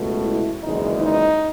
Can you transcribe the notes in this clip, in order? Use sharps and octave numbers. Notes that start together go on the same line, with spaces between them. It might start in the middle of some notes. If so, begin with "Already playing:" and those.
Already playing: C#2 B2 A3
E4
F#1 E2 D#3 G#3 D#4
D#4